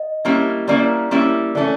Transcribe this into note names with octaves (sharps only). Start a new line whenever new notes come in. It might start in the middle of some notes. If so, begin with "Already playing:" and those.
Already playing: D#5
G3 A#3 C#4 E4
G3 A#3 C#4 E4 D5
G3 A#3 C#4 E4
E3 A3 C#4 D5